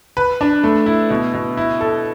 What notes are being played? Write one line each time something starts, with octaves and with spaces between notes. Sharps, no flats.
B4
D4
A3
E4
B2
B2
E4
A4